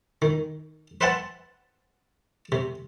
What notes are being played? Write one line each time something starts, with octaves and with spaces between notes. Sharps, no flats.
D#3
B4 C5 E5 F#5 G5 A5
C3